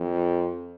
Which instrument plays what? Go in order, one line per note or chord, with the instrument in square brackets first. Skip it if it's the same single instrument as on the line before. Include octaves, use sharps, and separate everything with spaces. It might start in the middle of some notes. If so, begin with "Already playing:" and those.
Already playing: [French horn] F2